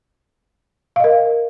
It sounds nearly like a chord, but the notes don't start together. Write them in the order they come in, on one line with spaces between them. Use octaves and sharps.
F5 D#5 A#4